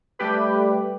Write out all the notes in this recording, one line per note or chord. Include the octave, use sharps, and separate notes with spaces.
G3 A3 G4 B4